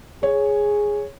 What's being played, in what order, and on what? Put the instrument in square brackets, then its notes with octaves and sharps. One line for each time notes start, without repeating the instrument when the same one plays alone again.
[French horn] G#4 [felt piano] C#5